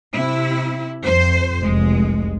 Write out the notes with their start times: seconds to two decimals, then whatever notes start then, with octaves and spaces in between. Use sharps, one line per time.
0.15 C3 E4
1.05 F2 C5
1.63 F1 C2 G#3